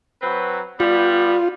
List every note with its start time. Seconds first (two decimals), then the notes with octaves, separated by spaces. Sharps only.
0.22 F#3 C4 B4
0.80 G3 B3 F4